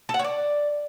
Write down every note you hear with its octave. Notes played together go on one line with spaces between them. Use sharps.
A4
F#5
C#5
D5